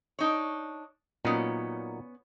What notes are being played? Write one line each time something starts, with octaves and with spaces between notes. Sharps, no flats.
D4 D#4 C#5
A#2 F#3 B3 C#4 D#4